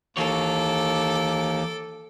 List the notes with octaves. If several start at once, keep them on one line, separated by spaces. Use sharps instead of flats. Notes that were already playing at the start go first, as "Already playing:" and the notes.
D#2 E3 A4 C#5 D6